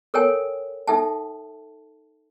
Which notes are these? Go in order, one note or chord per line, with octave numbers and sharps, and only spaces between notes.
A4 A#4 C#5 G5 G#5
D#4 A4 E5 G5 A5